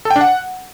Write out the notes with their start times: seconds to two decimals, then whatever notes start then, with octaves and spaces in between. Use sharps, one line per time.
0.05 A4
0.10 G5
0.16 D4
0.21 F#5